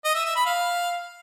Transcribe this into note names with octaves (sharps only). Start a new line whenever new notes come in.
D#5
E5
E5
B5
F5